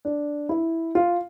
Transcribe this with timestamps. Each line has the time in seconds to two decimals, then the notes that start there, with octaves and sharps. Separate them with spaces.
0.05 D4
0.49 E4
0.95 F4